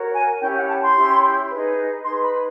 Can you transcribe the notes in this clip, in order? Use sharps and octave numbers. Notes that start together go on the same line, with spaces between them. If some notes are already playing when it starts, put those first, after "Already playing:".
Already playing: F#4 A#4 C#5
G#5
C#4 E4 G4 G5
F#5
A5
C6
C#4 E4 G4
D#4 G#4 B4
D#4 G#4 B4 C6
B5